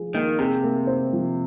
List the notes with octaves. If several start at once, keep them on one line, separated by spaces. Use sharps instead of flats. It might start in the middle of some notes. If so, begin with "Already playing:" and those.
Already playing: F3 G#4
D#3 A#3
C3 G#4
A#3
C5
F3